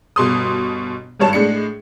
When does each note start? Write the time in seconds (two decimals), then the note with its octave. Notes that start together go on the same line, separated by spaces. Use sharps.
0.16 G1 B2 C6 D#6
1.20 G#1 G2 C#5 A5
1.33 A2 G#3 D4 C#7